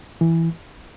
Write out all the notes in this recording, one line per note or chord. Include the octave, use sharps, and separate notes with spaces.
E3